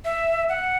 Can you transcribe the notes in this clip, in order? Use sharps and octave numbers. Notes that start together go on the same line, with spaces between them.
E5
F#5